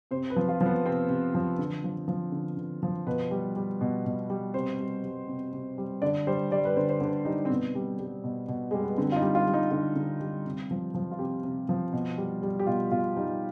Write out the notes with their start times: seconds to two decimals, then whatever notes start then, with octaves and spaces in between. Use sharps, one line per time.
0.11 C3 C5
0.30 B4
0.36 F3
0.49 F4
0.61 F3
0.66 B3
0.85 C3 C4
1.09 C3
1.35 F3
1.58 D3
1.84 F3
2.08 F3
2.32 D3
2.57 D3
2.83 F3
3.07 B2 B4
3.31 G3
3.56 G3
3.81 B2
4.06 B2
4.30 G3
4.54 C3 C5
4.79 G3
5.04 G3
5.28 C3
5.53 C3
5.78 G3
6.02 D3 D5
6.27 G3 C5
6.51 G3 D5
6.65 B4
6.76 D3 C5
6.89 C5
7.00 D3 B4
7.25 G3 D#4
7.45 C4
7.50 B2 B3
7.75 G3
7.99 G3
8.24 B2
8.48 B2
8.71 G3 G#3
8.84 B3
8.98 D3 C4
9.12 F4
9.16 D#4
9.22 G3
9.35 F4
9.47 G3
9.54 D#4
9.71 D3 F4
9.96 D3
10.20 G3
10.45 C3
10.71 F3
10.95 F3
11.11 F4
11.19 C3 G4
11.43 C3
11.69 F3
11.93 B2
12.18 G3
12.43 G3
12.59 G4
12.67 B2 F4
12.91 B2 F4
13.17 G3 D#4